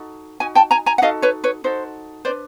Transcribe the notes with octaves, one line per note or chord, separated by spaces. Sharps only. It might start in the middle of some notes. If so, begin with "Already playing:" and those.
Already playing: D#4 F#4 A4
D#4 F#4 G#5
G5 A5
G#5 A#5
G#5 A#5
F#5
D#4 F#4 A4 D#5 F5
B4 C#5
B4 C#5
D#4 F#4 A4 C5
D4 G4 B4 C5 D5